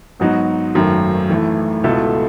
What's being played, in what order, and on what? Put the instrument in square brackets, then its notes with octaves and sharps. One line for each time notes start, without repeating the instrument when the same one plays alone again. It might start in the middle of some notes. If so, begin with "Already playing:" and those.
[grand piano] G#2 F#3 B3 D#4 F#4
G#1 F#2 D#3 A3
A1 A2 E3 A3
C#2 B2 A3 E4 A4